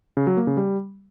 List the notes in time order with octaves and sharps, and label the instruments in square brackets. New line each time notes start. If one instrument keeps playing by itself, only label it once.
[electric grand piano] C#3
F#3
A#3
C#3
G3